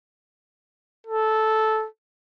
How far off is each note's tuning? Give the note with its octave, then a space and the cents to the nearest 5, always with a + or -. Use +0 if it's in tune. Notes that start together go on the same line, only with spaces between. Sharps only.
A4 -10